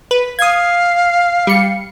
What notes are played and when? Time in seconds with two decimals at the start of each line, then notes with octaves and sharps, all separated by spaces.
0.11 B4
0.39 F5 D#6 G#6
1.47 G3 C#7